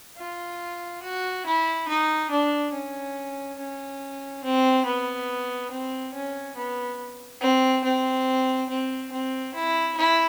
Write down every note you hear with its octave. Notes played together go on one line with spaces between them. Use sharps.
F4
F#4
E4
D#4
D4
C#4
C#4
C4
B3
C4
C#4
B3
C4
C4
C4
C4
E4
E4